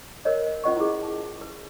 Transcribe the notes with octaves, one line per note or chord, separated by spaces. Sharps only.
A#4 C5 C#5 D#5
C#4 F4 C5 D#5 F#5 C#6
E4 G#4
A5
B4